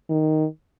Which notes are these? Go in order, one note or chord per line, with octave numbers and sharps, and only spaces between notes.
D#3